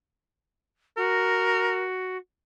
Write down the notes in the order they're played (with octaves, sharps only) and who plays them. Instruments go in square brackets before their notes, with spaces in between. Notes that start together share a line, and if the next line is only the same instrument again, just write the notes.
[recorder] F#4 [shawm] A#4